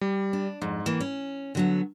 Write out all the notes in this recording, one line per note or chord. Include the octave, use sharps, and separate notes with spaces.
G3
D4
F2 G#2
E3 A#3 E7
C#4
D3 F#3 B3